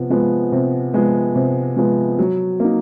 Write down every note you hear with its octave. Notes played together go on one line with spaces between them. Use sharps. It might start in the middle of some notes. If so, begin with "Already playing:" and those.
Already playing: C3 F3 B3
F3 G#3 B3
C3
F3 G#3 B3
C3
F3 G#3 B3
F#3
A#3 D#4